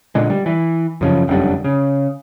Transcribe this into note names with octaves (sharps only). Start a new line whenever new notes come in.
A#2 D3 G#3
G3
E3
F#2 C#3 F3
F1 F#2 D3 G3
C#3